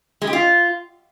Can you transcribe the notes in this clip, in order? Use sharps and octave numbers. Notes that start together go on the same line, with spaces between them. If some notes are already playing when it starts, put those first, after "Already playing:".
G#3
G4
F4